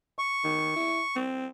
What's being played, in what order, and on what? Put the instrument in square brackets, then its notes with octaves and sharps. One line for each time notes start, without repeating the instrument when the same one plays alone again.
[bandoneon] C#6
[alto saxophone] D#3
E4
C4